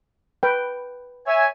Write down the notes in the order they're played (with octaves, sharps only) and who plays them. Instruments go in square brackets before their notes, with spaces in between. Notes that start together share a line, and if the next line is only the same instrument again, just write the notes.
[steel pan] B4 G5
[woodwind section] C#5 E5 G#5